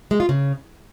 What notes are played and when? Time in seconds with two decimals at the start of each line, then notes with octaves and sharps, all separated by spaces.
0.11 G#3
0.20 F4
0.29 C#3